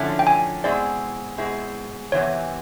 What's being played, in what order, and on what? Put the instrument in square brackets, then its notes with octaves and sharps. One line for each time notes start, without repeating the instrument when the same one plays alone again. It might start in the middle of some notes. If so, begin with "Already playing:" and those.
Already playing: [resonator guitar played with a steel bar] D3 F3 A3 C#4 E4
[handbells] G5
G#5
[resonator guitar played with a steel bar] B2 G#3 C4 E4 G#4 [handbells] D5
[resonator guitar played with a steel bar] B2 G#3 C4 E4 G#4
[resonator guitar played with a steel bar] E2 C3 E3 [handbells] C#5